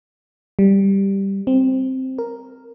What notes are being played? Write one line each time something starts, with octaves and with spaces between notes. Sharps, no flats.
G3
C4
A#4